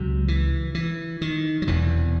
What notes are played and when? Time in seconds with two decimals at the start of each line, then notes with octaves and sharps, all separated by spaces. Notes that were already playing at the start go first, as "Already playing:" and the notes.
Already playing: C#2 C3 F#3
0.28 E3
0.75 E3
1.21 D#3
1.62 F#3
1.67 E1 E2 C3 E3